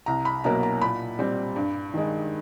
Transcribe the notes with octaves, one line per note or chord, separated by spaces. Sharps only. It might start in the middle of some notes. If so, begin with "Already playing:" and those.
C2 A#5
B5
B2 F#3 A#3 A#5
A#5
A#2 B5
G3 C4
G2
D#3 G#3